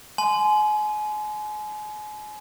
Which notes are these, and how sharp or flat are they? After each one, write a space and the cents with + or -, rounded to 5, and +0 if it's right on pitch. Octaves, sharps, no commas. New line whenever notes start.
G#5 +35 C6 -20